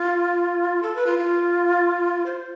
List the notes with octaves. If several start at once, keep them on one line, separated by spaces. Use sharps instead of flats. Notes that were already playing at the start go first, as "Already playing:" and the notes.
Already playing: F4
A4
B4
F4
F4
C5